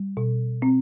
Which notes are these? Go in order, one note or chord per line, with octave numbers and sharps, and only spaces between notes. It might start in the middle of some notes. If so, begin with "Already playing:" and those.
Already playing: G3
B2
C4